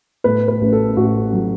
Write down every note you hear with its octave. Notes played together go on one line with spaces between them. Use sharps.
A2 B4
B4
A1
A4
A1 F#4
F#3